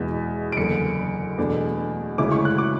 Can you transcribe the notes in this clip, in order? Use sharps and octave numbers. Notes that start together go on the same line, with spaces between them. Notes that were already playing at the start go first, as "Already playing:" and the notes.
Already playing: E2 B2 G#3 B3 E4
D7
F#1 E2 D3 C#7
E2 B2 A3 D4
D2 C#3 G#3 C#4 E4 D6
C#6
F#6
D6